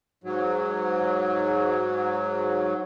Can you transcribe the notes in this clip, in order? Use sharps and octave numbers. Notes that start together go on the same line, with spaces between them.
G#2 F#3